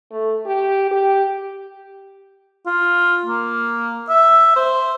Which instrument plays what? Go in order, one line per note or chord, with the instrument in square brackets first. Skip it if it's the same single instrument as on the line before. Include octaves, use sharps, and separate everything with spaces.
[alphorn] A3
G4
G4
[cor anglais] F4
A#3
E5
C5